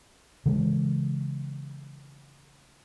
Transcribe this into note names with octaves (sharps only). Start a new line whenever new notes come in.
C#3 E3 G#3